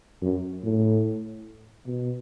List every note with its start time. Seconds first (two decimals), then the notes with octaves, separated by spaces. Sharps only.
0.22 F#2
0.64 A2
1.86 B2